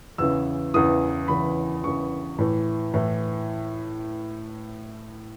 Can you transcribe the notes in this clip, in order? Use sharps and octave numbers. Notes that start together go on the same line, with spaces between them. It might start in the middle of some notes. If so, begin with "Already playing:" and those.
E2 C#3 E3 E6
E2 C#3 E3 D#6
E2 C#3 E3 B5
E2 C#3 E3 C#6
A2 E3
A2 E3